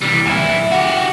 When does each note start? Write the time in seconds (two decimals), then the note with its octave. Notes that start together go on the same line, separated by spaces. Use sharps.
0.01 E3 G3
0.26 D2 E4
0.72 F#4 G4